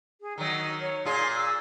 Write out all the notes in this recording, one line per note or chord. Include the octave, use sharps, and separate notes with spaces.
G#4
D#3 F#3 D#4
C#5
A#2 G#4 C6
E6